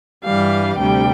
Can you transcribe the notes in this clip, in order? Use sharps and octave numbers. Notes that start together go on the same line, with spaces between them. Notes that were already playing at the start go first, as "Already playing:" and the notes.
G2 E3 G3 F5
D2 C3 G3 G5